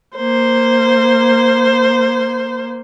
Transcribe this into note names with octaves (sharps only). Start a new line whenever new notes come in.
A#3 C5